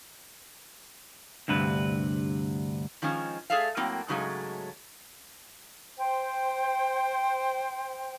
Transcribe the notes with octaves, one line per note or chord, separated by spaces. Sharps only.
D2 G2 C3 B4
D#3 F3 G#3 C#4
A3 G#4 A4 D5 E5 F5
A2 F#3 A#3 C4 G5
G#2 C#3 F#3 G#3 A3
C5 G5